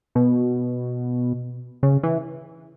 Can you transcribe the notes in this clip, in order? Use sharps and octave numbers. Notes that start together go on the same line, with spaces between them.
B2
C#3
E3